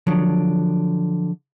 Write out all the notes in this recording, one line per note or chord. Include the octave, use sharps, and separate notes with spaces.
D3 F3 F#3